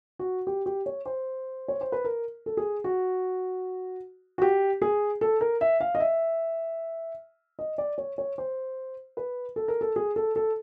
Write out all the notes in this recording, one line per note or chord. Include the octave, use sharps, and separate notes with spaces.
F#4
G4
G4
C#5
C5
C#5
C5
B4
A#4
A4
G#4
F#4
F#4
G4
G#4
A4
A#4
E5
F5
D#5
E5
D#5
D5
C#5
C#5
C5
B4
A4
A#4
A4
G#4
A4
A4